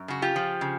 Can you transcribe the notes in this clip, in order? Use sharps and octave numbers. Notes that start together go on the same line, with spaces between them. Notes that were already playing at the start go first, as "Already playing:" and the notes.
Already playing: F#2
C#3 F#4
F4 G4
F3
C#3